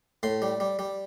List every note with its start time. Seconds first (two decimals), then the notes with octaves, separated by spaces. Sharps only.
0.23 A2 C6
0.42 G3
0.60 G3
0.79 G3